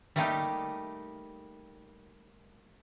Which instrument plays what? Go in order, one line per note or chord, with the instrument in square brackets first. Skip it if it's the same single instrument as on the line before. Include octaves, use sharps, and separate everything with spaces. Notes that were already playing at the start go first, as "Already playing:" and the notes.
[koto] G3 A3 A#3 D#4 G4